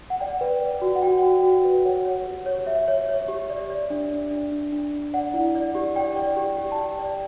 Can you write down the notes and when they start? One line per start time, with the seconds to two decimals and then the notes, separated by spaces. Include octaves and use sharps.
0.10 F#5
0.20 D5 G5
0.41 B4
0.61 D5
0.82 F#4
0.96 F#5
1.02 F#4 G5
1.23 F#4
1.43 F#4
1.64 B4
1.85 C#5 F#5
2.05 C#5
2.26 G4
2.46 C#5
2.67 C#5 E5
2.88 C#5
3.09 C#5
3.28 G4
3.50 D5
3.70 D5
3.90 D4
4.11 D5
4.31 D4
4.52 D4
4.72 D4
4.93 D4
5.14 D5 F#5
5.34 E4
5.55 D5
5.75 G4
5.96 D5 G5
6.17 D5
6.37 G4
6.57 G4
6.72 A5
6.78 D5 G5
6.99 D5